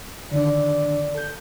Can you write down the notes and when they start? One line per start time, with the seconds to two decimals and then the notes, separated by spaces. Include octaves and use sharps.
0.31 D3 D#3 D4 D5
1.15 A4 G6